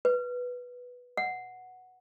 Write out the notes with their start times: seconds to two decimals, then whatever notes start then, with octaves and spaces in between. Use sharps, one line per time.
0.05 B4
1.17 F#5